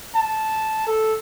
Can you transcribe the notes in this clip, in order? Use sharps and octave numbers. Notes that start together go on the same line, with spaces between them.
A5
A4